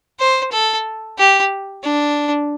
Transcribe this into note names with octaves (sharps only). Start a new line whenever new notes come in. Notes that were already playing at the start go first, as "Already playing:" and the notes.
C5
A4
G4
D4